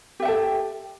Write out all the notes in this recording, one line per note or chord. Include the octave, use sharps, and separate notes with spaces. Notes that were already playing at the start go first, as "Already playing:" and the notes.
G4 A4 E5 G5